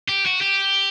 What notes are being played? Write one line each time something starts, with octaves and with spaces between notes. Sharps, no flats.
G4
F#4
G4